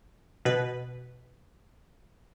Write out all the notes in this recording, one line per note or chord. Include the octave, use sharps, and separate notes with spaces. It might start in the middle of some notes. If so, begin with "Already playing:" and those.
B2 B4